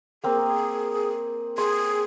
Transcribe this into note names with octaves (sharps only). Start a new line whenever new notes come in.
A#3 C4 G#4
G#4 C6